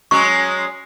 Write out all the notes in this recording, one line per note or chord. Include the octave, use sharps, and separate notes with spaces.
F#3 G#3 C#4 C#6